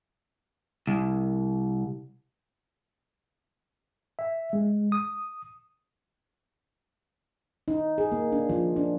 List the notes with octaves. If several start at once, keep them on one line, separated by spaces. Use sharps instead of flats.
C2
E5
G#3
D#6
D#4
G#4
A#3
D4
F3
D4